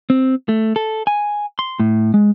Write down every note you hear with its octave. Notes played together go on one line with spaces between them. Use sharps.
C4
A3
A4
G#5
C6
A2
G#3